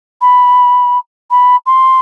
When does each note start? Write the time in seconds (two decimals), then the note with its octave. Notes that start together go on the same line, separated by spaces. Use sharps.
0.21 B5
1.31 B5
1.66 C6